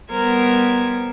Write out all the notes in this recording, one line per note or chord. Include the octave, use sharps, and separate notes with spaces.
G3 B3 A#4 C5 G#6